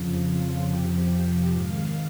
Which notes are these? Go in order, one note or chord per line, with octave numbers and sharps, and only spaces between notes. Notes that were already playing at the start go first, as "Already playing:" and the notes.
Already playing: F2 C#3 F3
F4
F2 C3 F3 G4
G4
G#2 D#3 F5